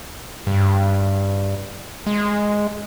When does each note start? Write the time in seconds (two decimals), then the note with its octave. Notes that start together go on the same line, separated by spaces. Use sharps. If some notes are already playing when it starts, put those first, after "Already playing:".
0.47 G2
2.07 G#3